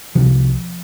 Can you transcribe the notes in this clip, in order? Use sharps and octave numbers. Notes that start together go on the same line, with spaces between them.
C2 C3 F3